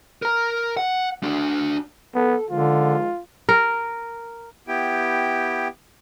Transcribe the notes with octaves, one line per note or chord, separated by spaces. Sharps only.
A#4 A#5
F#5
D4 F#4
B3 A4
D3 D#3 F3 G#3 F4
A#4
B3 E4 G4 G5